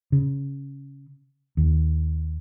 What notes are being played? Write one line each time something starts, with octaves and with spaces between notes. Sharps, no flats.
C#3
D#2